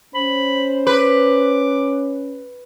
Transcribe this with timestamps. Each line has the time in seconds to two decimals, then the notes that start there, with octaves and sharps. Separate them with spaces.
0.15 C#4 C5 B5
0.87 B4 D6